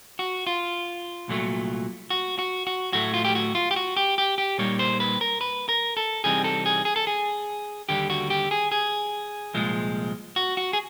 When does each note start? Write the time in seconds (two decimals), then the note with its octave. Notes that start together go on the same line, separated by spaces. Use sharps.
0.19 F#4
0.47 F4
1.28 C2 A#2 F#3 A3
2.10 F#4
2.39 F#4
2.67 F#4
2.93 A2 F#3 A3 F#4
3.14 F4
3.25 G4
3.35 F#4
3.55 F4
3.71 G4
3.76 F#4
3.97 G4
4.18 G4
4.38 G4
4.58 A#2 G3 A#3 D#4 C#5
4.79 C5
5.00 B4
5.21 A#4
5.41 B4
5.69 A#4
5.97 A4
6.24 C3 E3 G3 C4 D#4 G#4
6.44 A4
6.66 G#4
6.85 G#4
6.96 A4
7.07 G#4
7.89 D#2 D3 G3 G4
8.10 F#4
8.30 G4
8.51 G#4
8.72 G#4
9.54 C2 A#2 F3 G#3
10.36 F#4
10.57 F#4
10.73 G#4